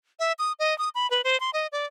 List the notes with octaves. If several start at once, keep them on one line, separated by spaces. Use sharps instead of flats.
E5
D#6
D#5
D#6
B5
B4
C5
C6
D#5
D5